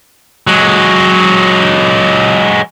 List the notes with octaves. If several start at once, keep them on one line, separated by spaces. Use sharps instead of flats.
F#3 G#3